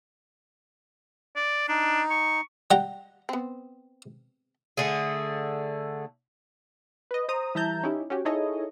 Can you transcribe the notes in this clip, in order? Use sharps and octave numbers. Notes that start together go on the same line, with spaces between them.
D5
D4 D#4
C#6
G3 F#5 G5 A#5
B3 C4
D3 A3 G#4
B4 D#5
C5 A#5 D#6
E3 G3 E5 A5 A#5 G6
C#4 D#4 E4 G4
C#4 F#4 G4
D#4 E4 G#4 A4 C#5 D#5